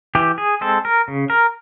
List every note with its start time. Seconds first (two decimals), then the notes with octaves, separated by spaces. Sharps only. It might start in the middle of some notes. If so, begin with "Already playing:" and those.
0.15 E3 G4
0.38 G#4
0.61 G#3 C4 A4
0.85 A#4
1.08 C#3
1.30 A#4